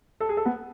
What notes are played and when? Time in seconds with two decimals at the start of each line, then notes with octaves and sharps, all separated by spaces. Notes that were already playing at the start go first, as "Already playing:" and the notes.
0.20 A4
0.29 G#4
0.37 A4
0.45 B3